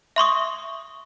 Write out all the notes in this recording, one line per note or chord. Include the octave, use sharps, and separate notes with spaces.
E5 C6 C#6 D#6